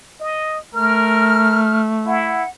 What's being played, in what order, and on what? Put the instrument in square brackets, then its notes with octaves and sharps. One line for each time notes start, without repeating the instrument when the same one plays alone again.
[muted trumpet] D#5
[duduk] A3 [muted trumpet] A#4 [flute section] F6
[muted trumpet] E4 [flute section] F#5